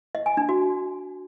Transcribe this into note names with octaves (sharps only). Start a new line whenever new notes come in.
D#5
G#5
D4
F#4